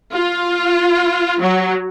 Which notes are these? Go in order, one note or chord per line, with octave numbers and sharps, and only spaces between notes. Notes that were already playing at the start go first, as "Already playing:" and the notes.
F4
F#3